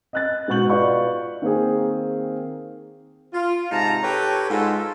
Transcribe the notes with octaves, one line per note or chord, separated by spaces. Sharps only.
D#5 F#6 A6
G#2 B2 F#5 C#6 G6 F#7
F4 B4 D5 D#5 C#6
D#3 A#3 C4 G#4
F4
G#2 C3 D#4 A5 A#5
G4 A4 B4 C#5
G#2 G#3 F4 A4